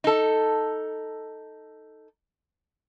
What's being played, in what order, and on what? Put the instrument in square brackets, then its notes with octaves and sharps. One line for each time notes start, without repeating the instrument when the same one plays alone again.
[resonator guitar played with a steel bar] D#4 A4